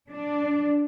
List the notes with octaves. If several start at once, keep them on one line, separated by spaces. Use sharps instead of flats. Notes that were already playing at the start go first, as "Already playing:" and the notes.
D4